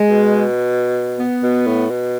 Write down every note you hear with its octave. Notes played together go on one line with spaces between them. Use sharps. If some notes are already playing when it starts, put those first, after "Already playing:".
Already playing: G#3
B2
B3
B2
A2
B2